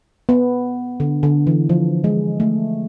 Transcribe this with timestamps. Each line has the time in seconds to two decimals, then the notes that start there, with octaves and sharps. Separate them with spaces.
0.29 B3
1.00 D3
1.23 D3
1.47 E3
1.69 F3
2.04 G#3
2.40 A3